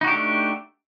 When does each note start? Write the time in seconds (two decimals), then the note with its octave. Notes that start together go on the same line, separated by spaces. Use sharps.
0.01 D#4
0.04 F#4
0.08 G4
0.11 D4
0.14 A3